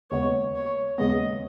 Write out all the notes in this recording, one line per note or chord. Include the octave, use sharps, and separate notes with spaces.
D#2 C#3 G#3 B3 C#5
C#5
D#2 C#3 G#3 B3 D#5